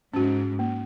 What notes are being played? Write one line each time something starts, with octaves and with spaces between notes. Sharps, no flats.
G#2 C#4 F#4
A#3